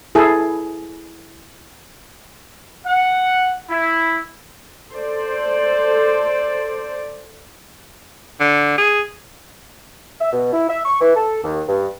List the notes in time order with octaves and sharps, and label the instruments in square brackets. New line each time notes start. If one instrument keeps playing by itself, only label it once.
[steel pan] E4 G#4 A4
[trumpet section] F#5
E4
[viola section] A4 C5 D5
[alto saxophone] D3
G#4
[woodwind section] E5
B2
E4
E5
C#6
E3
A4
D#2
G2